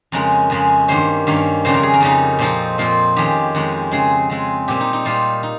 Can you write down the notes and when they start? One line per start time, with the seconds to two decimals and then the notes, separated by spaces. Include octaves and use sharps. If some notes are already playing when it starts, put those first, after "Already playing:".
0.12 F2 C#3 G#3 C#4 A#4
0.50 F2 C#3 G#3 C#4
0.88 G2 D#3 A#3 C#4 C5
1.27 G2 D#3 A#3 C#4
1.65 F2 C#3 G3 C#4 C5
1.74 A#4
1.83 G#4
1.93 A#4
2.00 F2 C#3 G3 C#4 D#4
2.39 A#2 F3 C4 D#4
2.78 A#2 F3 C4 F4
3.16 F2 D#3 G#3 C#4 G4
3.55 F2 D#3 G#3 C#4
3.91 C#3 G#3 C4 G#4
4.30 C#3 G#3 C4
4.68 A#2 G3 C4 G4
4.80 D#4
4.93 D#4
5.05 A#2 G3 C4 F4
5.43 D#4